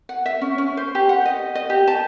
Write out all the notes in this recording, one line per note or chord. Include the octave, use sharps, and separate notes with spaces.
F#5
E5
C#4
C#4
C5
G4
F#5
D#5
D#5
G4
A5